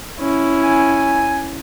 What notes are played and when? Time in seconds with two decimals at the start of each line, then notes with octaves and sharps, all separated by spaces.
0.20 C#4 E4
0.62 G#5